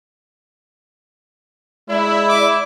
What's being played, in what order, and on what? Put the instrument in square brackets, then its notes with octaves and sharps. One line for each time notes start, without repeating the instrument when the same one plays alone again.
[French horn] G#3 [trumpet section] E4 [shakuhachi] D5
[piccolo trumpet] D6